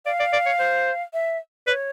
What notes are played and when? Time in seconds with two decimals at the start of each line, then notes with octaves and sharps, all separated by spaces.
0.06 D5 F5
0.20 D5
0.33 D5
0.46 C#5
0.60 C5
1.13 E5
1.67 B4 D5
1.71 C#5